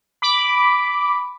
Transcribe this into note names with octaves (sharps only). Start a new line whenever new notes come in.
B5 D6